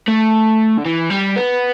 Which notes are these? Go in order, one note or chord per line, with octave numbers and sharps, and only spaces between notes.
A3
D3
E3
G3
B3